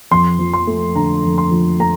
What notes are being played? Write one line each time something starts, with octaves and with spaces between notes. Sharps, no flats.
F2 C6
F3
C6
A3
D3 A#5
F2
C6
F3
A3 A#5